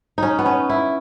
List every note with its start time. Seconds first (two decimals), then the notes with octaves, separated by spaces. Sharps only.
0.18 C#4 D#4
0.39 B3
0.46 C#4
0.69 E4